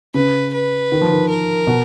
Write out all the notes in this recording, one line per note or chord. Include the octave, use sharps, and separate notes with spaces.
C#3 B4
B4
D#3
F3
D#3
A#4
B2